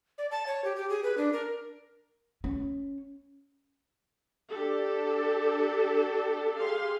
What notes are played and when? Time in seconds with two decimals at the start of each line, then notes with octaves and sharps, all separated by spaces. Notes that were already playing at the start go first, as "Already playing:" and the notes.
0.18 D5
0.31 A5
0.47 C#5
0.65 G4
0.76 G4
0.90 G#4
1.04 B4
1.18 D4
1.33 A#4
2.44 C#4
4.51 D4 G4 A4
6.57 G4 G#4 F5 C6